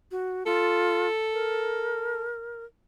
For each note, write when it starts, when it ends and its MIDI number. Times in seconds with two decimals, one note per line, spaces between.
0.11 0.44 66
0.46 1.08 65
0.46 2.25 69
1.33 2.65 70